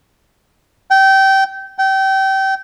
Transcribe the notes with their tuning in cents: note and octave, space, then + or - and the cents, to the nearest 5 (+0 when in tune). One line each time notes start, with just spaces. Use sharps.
G5 -20
G5 -25